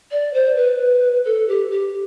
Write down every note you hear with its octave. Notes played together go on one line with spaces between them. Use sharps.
D5
C5
B4
A4
G4
G4